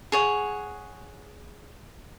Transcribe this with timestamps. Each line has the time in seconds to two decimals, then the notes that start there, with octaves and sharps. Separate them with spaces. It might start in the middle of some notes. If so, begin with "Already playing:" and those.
0.12 G#4 C#5 F#5